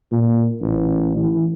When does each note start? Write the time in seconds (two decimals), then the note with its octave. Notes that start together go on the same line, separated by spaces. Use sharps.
0.12 A#2
0.61 A1
1.16 E3